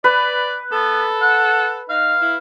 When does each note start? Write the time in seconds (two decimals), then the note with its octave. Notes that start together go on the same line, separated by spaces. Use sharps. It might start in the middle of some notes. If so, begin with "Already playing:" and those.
0.04 B4 D5
0.72 B3 A4
1.22 F#5
1.90 D#4 F5
2.22 E4